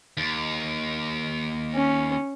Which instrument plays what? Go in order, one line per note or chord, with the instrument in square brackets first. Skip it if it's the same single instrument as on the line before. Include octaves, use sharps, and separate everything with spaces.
[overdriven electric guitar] D#2
[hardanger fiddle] C#4